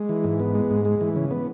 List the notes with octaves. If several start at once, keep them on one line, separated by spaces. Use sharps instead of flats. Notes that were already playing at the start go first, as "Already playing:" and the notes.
Already playing: G#3
E3
G#2
B3
G#3
G#2
G#3
E3
C#3
B3